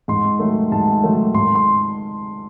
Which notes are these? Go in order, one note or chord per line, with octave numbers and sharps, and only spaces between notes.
G#2 C6
D#3 F#3 A3
G#2 A5
D#3 F#3 A3
G#2 C6
C6